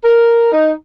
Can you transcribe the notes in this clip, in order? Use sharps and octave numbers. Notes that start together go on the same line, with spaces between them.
A#4
D#4